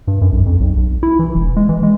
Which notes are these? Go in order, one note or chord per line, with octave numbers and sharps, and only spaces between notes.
G2
F#2
B1
F2
B1
B1
E4
E3
E1
G#3
E3
G#3